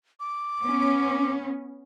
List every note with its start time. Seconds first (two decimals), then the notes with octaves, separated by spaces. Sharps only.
0.20 D6
0.61 B3 C#4